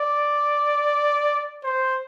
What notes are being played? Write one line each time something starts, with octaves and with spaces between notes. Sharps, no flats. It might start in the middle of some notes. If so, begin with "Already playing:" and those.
Already playing: D5
C5